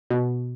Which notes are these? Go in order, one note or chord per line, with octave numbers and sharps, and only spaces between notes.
B2